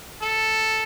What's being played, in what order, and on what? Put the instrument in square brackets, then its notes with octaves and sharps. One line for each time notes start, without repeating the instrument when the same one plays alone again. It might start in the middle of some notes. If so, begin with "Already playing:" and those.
[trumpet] A4